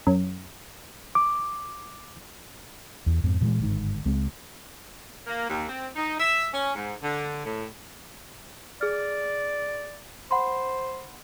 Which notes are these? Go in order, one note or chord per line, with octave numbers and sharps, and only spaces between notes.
F#2
D6
E2
F2 G#2 C4
A#2 E3 F3 G#3
G1 G#2 D#3
C#2 G#3 C4
A#3
D#2
C4
D#4
E5
C#4
G#2
D3
A2
G#4 D5 F6
C5 F#5 B5 C6